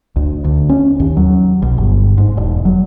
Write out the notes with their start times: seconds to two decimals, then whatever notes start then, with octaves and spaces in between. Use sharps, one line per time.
0.16 D2
0.44 D2
0.69 C#4
1.00 D#2
1.17 F#3
1.62 B1
1.78 G1
2.18 G#2
2.37 E1
2.65 F#3